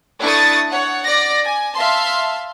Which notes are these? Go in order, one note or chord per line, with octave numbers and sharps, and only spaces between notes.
A3 D4 E4 C#6 D#6 A6
C#5 F#5
D5 A#6
G#5
E5 F5 A5 C6